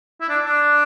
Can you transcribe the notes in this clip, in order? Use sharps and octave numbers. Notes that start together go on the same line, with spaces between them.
E4
D4
D4